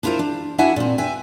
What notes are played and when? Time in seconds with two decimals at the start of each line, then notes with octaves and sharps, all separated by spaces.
0.03 D4 E4 F4 G4 A#4 C5
0.19 D4
0.58 D4 E4 F#4 E5 F#5 G#5
0.76 A#2 C4
0.98 B4 E5 G5 G#5